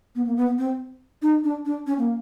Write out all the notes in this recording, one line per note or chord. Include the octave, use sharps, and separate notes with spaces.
B3
A#3
B3
C4
D#4
D4
D4
C#4
A#3